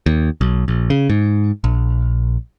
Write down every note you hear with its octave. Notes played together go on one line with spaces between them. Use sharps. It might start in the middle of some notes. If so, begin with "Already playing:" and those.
D#2
B1
A#1
C#3
G#2
A#1